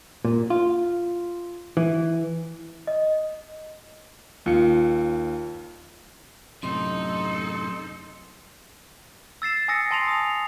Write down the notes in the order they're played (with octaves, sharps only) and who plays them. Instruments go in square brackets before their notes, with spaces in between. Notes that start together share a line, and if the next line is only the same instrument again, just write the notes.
[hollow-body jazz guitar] A#2
F4
E3
[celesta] D#5
[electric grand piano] D#2 C#7 [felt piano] F4
[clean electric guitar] F#2 A2 C3 [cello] D#4 A4 [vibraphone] C6
[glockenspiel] E6 A6 C7 E7
G#5 D#6 E6 A#6 C#7
G#5 A5 C6 A#6 C7 F7
D#6 F7